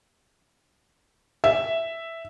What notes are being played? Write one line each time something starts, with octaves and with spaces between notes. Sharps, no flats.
E5